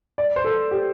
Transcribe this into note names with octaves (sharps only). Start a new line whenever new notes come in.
D5
C5
A4
G4